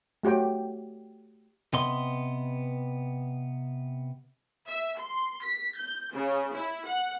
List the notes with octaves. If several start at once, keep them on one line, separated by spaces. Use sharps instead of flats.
A3 F#4 G4 C#5 G5
C3 B3 B4 D#5 C6
E5
C6
B6
G6
C#3
E4
F#5